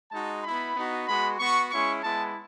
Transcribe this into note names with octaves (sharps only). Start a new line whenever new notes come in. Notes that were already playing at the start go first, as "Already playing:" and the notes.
G#3 D#4 F#4 A5
B3 E4 B5
B3 D#4 F#4
G#3 B3 F#4 B5
B3 F#4 C#6
G#3 C#4 E4 C#6
G#3 B3 E4 A5